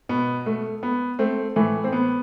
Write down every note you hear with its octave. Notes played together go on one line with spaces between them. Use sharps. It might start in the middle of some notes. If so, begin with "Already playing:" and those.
B2 B3
A3
B3
A3 C4
A2 E3 A3
C4
B3